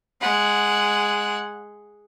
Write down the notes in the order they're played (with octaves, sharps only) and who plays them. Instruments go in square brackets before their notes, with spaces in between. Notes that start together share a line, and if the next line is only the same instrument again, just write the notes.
[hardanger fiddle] G#3 F#5